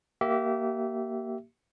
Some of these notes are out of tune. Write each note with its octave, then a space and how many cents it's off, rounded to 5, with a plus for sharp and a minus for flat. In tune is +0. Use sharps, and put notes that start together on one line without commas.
A#3 +0 G4 -30 E5 +0